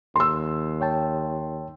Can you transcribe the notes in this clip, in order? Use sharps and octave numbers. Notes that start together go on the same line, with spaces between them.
D#2 C6 E6
C#5 G5 A5